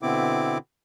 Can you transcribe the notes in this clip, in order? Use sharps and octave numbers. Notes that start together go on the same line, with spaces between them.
B2 D3 B3 C4 E4 D6